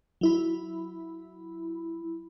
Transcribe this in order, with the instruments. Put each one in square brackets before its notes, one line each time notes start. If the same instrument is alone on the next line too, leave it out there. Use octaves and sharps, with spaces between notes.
[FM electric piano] F#3 E4 B5